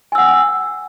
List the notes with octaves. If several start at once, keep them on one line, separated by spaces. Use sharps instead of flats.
F#5 G#5 E6